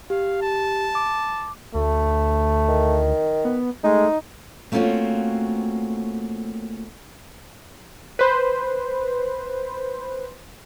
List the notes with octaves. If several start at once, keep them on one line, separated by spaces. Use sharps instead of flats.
G4 F5
A5
D6
D2 A3
D#3
B3
G#3 A3 D#4
A3 A#3 C4 C#4 F4 F#4
B4 C5